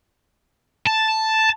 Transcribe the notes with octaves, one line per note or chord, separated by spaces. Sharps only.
A5